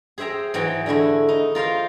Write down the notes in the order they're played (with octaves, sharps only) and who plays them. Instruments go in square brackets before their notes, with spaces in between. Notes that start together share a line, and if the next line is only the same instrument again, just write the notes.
[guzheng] G#4 C5 E5 G5 A#5
G#2 E3 F#3 G5
D3 G#3 A3 E4
D#4
F4 A#4 C5 F5